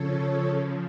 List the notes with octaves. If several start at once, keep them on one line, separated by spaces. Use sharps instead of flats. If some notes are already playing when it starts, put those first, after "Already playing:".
Already playing: C#3 F3 A4 C#5
C#3 F3